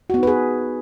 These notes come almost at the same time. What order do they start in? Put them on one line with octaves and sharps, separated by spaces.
F#4 B3 D#4 B4 G#4